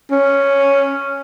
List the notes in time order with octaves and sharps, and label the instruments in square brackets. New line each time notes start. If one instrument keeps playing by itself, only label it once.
[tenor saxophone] C#4